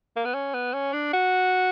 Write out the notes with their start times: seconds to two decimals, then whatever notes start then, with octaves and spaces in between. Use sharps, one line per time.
0.16 A#3
0.25 B3
0.34 C#4
0.54 B3
0.74 C#4
0.93 D4
1.13 F#4